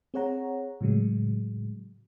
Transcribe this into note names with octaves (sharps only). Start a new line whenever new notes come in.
C4 G#4 C#5 F#5 A#5
A2 C#3 F#3 G#3